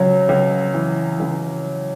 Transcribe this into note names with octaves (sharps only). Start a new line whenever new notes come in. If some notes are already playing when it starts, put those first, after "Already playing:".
Already playing: C#2 F#3
C#2
E3
C#2